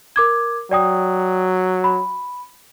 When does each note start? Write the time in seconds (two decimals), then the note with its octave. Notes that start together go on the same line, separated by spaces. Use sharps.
0.16 A#4 D6 G#6
0.71 F#3 D5 G5 D#6
1.84 B5